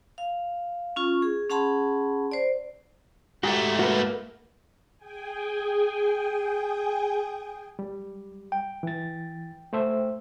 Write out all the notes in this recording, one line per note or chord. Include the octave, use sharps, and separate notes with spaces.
F5
C#4 F4 C#6
G#4
C#4 G#4 F#5 A5 B5 C6
C5 D5
G#2 A3 F#4 G4
A#3 F#4 B4
G#4 G5 G#5
G3
G5
E3 A6
A3 C5 E5